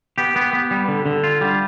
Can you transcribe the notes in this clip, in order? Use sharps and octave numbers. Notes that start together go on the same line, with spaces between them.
B3 G4
B3
B3
G3
D3
D3
F4
G3